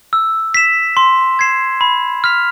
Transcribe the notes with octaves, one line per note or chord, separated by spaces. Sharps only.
E6
B6 E7
C6
G#6 C7 E7
B5
F6 B6 F7